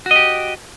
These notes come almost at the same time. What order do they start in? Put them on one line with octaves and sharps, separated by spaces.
F#4 D#5 G4